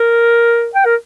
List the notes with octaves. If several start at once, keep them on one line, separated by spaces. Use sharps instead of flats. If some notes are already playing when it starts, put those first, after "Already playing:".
Already playing: A#4
G5
A#4